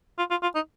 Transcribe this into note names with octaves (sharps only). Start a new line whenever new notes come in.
F4
F4
F4
D#4